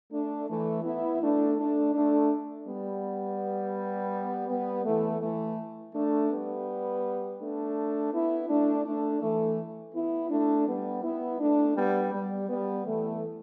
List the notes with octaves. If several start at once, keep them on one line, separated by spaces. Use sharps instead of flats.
A3 D4
E3 A3
B3 E4
A3 D4
A3 D4
A3 D4
G3 B3
G3 B3
E3 A3
E3 A3
A3 D4
G3 B3
A3 D4
B3 E4
A3 D4
A3 D4
E3 A3
B3 E4
A3 D4
G3 B3
B3 E4
A3 D4
G3 B3
G3
G3 B3
E3 A3